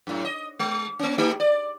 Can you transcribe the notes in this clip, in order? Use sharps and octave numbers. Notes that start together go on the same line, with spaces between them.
F#2 A2
D#5
G#3
A#3 C#4
A3 D#4 G4
D5